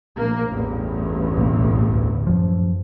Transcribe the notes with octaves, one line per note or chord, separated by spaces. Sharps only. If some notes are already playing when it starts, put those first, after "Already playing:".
A#1 A#3
A1 E2 G2
B1 E3 A#3
D2
F#2 F3